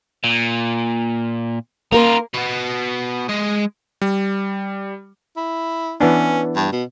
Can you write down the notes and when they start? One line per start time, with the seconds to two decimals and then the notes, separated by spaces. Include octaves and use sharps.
0.24 A#2
1.92 A#3 D#4 F4 A#4
2.34 B2 B3
3.29 G#3 D#5
4.02 G3
5.37 E4
6.01 E3 B3 C#4 D4
6.56 G2
6.72 B2